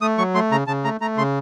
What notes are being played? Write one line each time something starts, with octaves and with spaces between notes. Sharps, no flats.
A3 D#6
F#3 C#6
A3 C6
C#3 A#5
C#3 A5
A3 A#5
A3 A#5
C#3 C6